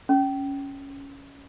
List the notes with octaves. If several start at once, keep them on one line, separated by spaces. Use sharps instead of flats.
C#4